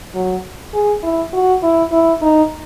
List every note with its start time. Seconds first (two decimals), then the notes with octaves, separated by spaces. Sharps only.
0.15 F#3
0.74 G#4
1.03 E4
1.33 F#4
1.63 E4
1.92 E4
2.21 D#4